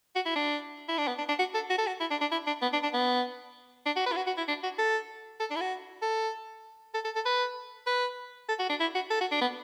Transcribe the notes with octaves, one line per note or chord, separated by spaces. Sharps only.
F#4
E4
D4
E4
D4
B3
D4
D4
F#4
A4
F#4
A4
F#4
E4
D4
D4
E4
D4
B3
D4
D4
B3
D4
F#4
B4
E4
F#4
F#4
E4
D4
F#4
A4
A4
D4
E4
F#4
A4
A4
A4
A4
B4
B4
A4
F#4
D4
E4
F#4
A4
F#4
D4
B3